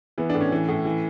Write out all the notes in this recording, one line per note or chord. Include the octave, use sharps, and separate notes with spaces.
E3 B3
A2 D4
C#4
E3
A2
E3